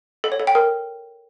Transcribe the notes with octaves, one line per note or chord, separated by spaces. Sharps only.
A4
C#5
A4
G5
A#4